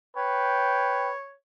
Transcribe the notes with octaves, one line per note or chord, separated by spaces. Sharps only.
B4 C#5 G5